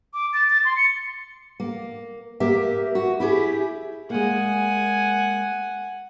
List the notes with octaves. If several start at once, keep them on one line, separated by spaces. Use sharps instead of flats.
D6
A6
A6
C6
C#7
A#3
A#3 G4 A#4 E5
F#4
E4 G4 G#4
G#3 A#3 F#5 G#5